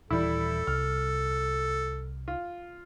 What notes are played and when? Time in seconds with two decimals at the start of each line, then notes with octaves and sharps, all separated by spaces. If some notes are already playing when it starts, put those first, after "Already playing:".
0.10 D#1 E3 G3 E4 A4
0.67 C2 F6
2.28 F4